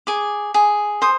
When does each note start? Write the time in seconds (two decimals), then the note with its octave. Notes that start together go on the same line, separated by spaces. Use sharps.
0.07 G#4 D6
0.54 G#4
1.02 C5 D#6